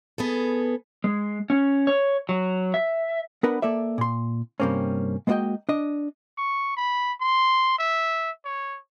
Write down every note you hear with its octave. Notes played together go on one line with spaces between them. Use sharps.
B3 G#4 A4
G#3
C#4
C#5
F#3
E5
B3 D4 A#4 B4 F#5
A#3 A4 D5 E5
A#2 C6
G2 C3 A#3 C4 C#4
G#3 A#3 B3 F#4 D#5 G5
D4 D#5
C#6
B5
C6
E5
C#5